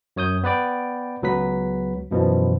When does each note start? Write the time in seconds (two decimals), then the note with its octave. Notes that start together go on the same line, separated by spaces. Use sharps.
0.16 F#2 C#5 D#6 G6
0.44 B3 B4 D5 G5
1.23 C#2 F#3 B3 B4 B6
2.11 F#2 B2 E3 F3